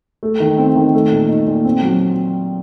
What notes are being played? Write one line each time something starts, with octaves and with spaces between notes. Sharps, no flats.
A3
D#3
C4
D#3
A3
A#2
D#4
A#2
C4
F#3